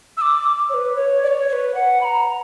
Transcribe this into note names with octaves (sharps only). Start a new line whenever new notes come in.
E6
D6
C#5
B4
C#5
D5
C#5
C#5
B4
F#5
B5
A#5